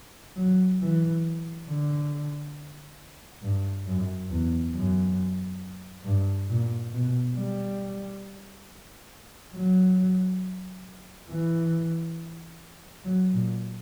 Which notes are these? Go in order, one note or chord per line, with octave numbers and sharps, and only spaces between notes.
F#3
E3
D3
G2
F#2
E2
F#2
G2
A#2
B2
G3
F#3
E3
F#3
A#2